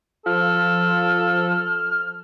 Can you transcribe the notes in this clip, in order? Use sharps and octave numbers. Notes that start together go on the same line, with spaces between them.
F3 A4 F6